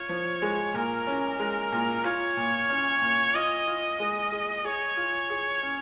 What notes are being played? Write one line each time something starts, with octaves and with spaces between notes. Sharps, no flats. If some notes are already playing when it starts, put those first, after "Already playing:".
Already playing: F4 C#5
F3
G#3
A#2 A#4
C#4
G#3
A#2
F4 C#5
A#2
C#4
A#2
F4 D#5
F4
G#3
G#4
G#4 C#5
F4
G#4
C#4